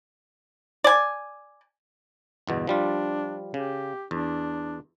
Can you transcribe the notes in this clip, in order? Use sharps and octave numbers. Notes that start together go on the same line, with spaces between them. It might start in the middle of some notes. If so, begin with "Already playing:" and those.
D5 G#5
G1 E2 B2
F3 G3 D4 F4
C#3 G4
E2 D4